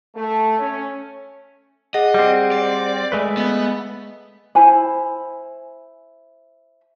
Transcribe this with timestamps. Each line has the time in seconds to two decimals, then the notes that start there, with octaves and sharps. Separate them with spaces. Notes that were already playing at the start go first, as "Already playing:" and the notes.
0.16 A3
0.59 C#4
1.94 G#4 D#5 F#5 A#6
2.14 G3 C4
2.52 D5
3.12 G#3 A3 B4
3.37 B3 D#5
4.55 E4 C5 G#5 B5